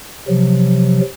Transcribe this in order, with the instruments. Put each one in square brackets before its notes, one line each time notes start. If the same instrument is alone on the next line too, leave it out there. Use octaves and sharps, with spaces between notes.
[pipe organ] C3 F3 F#3